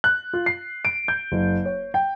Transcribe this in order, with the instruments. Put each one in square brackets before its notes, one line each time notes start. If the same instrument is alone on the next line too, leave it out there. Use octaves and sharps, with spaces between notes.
[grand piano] F#6
F4
C7
D7
G6
F#1
C#5
G5